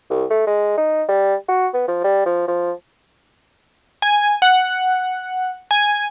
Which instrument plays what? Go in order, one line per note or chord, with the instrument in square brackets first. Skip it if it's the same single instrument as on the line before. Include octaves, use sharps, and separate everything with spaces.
[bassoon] C2
A3
G#3
D#4
G3
F#4
B3
F3
G3
F3
F3
[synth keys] G#5
F#5
G#5